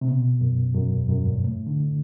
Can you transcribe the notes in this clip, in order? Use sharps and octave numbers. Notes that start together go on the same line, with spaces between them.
C3
B2
F#2
F#2
E2
F#2
G2
A2
D3